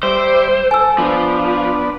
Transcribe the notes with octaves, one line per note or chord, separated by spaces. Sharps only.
G3 C5 E5 D6
A4 G#5 E6
F3 B3 D4